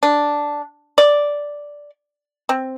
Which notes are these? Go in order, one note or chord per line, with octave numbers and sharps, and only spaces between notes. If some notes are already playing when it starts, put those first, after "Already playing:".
D4
D5
C4